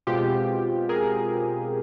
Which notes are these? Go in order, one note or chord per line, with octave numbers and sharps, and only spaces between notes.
B2 G#3 C4 F4 G4
G#4 A#4